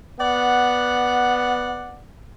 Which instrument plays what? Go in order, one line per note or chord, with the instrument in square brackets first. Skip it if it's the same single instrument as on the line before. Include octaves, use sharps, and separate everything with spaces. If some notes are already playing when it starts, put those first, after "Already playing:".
[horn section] B3 D5 F#5